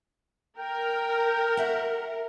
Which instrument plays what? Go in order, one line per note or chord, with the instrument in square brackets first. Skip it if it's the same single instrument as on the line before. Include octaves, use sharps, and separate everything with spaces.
[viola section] A#4 [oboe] G5
[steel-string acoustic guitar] F#4 E5 F#5